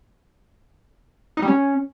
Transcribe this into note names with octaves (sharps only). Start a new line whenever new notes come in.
D#4
G3
C#4